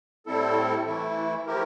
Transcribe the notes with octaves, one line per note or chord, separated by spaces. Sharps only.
A2 G3 C4 E4 A4
E3 A3 E4
F3 A3 E4 G4 A#4